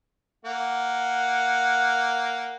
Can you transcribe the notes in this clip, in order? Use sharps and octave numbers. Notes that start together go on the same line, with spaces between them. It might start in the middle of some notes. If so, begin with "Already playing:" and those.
A#3 F#5